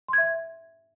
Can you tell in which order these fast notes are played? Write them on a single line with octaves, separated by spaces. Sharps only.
C6 G#6 E5